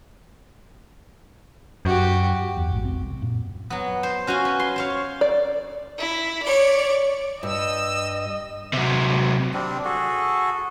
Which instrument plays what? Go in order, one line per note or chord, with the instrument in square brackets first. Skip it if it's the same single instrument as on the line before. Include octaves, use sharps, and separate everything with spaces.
[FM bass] F#2 [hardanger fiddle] F#4 G4
[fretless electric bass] E2
A1 G#2
E1 C4
C2
F#2 A#2
[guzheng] F#3 B3
C5
C#4 F#4 F5 G#5
B4
C6
C5 C#5 F5
[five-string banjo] D5
[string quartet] E4
C#5 D5
[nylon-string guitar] G2 [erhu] D#5 [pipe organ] E6
[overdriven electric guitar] C3 F#3
[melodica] G3 C4 D4
F#4 G#4 A4